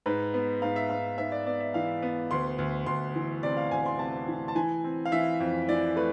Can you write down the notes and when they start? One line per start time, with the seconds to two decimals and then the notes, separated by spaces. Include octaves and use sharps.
0.06 G#2 B4
0.34 B3
0.62 G#2 F5
0.76 E5
0.90 G#2 F5
1.18 G#2 E5
1.32 D5
1.46 B3 D5
1.60 E5
1.74 E3 F5
2.02 B3
2.31 D2 C6
2.58 D2
2.86 D2 C6
3.15 E3
3.43 C3 D5
3.57 F5
3.71 D2 G#5
3.86 C6
3.99 C3 A5
4.28 E3
4.48 A5
4.55 E3 G#5
4.84 C4
5.06 F5
5.12 E3 E5
5.40 F2
5.69 E3 D5
5.96 A3 B4